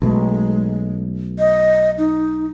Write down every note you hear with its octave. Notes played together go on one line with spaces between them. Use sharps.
B1 B2 G#3 A3
D#5
D#4